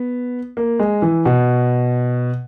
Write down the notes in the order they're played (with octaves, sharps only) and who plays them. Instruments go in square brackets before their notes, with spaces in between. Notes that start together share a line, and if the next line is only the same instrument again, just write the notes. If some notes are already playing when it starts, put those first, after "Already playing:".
Already playing: [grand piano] B3
A#3
G#3
E3
B2